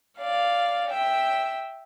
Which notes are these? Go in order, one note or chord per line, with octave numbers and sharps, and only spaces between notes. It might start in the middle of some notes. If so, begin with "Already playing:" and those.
D5 F5
E5 G5